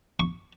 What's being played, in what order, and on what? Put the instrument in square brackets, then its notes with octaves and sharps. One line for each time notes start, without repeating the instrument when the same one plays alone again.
[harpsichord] C#6